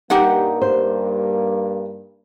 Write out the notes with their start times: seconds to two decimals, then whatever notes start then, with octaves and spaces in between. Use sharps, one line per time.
0.10 G2 A#3 D#4 G4 F#5
0.62 C5